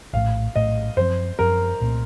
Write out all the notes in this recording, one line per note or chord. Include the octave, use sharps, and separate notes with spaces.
A#1 A2 A3 F5
A#1 A2 A3 D#5
F#2 F3 C4 C5
F#2 F3 C4 A#4
C2 A#2 A3 C4